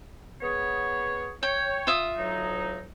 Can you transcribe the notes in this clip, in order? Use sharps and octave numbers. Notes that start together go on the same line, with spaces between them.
B3 G#4 C#5
C#5 G5
F4 E5 D#6
D2 F#3 D#4